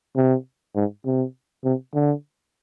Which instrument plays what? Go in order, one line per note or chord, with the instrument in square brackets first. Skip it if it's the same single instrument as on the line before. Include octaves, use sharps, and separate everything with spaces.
[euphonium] C3
G#2
C3
C3
D3